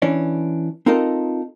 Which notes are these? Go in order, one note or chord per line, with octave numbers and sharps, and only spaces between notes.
E3 C#4 D4
C4 D#4 F4 A4 A#4 D#5